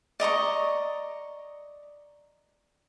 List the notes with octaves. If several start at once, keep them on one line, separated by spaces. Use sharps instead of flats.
D5 D#5 A#5 C#6